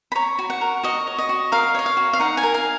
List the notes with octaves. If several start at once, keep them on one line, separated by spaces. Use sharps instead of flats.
B5
C#5 A#5
F#4
F#5
A#4
F#4 D#5
C#5
D#5
F#4
A#4 F5
C#5 D#5
F5
F#4
F5
D#4 F#5
G#5
A#4
F5